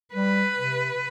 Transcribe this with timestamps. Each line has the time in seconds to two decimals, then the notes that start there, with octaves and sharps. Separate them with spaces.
0.14 G3 B4
0.57 C3